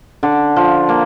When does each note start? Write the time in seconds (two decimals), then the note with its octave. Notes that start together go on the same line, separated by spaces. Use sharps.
0.23 D3
0.56 F3
0.89 A#3